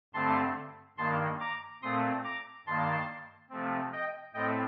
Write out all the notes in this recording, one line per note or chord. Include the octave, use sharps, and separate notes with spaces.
G2 D3 A3 C4 A5 C6
G2 D#3 A#3 A5 C6
A#5 D6
A#2 A3 C4 C6 D#6
A#5 D6
G2 D#3 A#3 A5 C6
C3 F3 A3 C4
D#5 G5
A2 A3 C4 D#5 G5